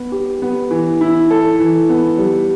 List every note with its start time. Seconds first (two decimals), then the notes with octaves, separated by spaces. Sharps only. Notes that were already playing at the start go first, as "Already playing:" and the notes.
Already playing: B3
0.12 G4
0.42 B3
0.71 E3
1.01 E4
1.31 A4
1.60 E3
1.89 B3
2.18 G3